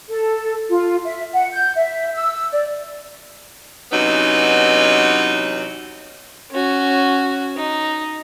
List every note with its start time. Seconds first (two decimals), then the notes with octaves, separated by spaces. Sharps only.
0.09 A4
0.70 F4
1.05 E5
1.33 F#5
1.52 G6
1.75 E5
2.15 E6
2.51 D5
3.92 C3 E3 F#3 B3 C#4 D#4
6.51 C#4 F#4
7.56 D#4